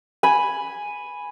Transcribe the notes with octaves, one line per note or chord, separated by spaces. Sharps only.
G#5 B5